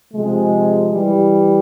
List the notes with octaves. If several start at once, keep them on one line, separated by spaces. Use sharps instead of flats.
C3 F3 G#3
E3 G3